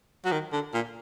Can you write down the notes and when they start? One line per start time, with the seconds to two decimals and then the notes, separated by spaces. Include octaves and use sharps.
0.25 F#3
0.32 D#3
0.52 D3
0.74 A#2